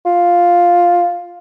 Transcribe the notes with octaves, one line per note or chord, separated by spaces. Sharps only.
F4